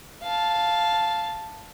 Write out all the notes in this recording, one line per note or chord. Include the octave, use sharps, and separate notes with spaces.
F5 A5